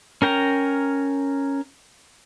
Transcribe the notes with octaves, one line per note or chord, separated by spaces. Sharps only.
C#4 A#4 G5 A#5